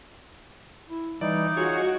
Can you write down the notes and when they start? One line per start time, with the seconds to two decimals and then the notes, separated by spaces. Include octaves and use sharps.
0.89 E4
1.21 E3 G3 D#4 D5
1.57 F4 F#4 G#4 C#5